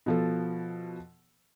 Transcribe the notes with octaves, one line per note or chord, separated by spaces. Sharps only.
B2 F3 A4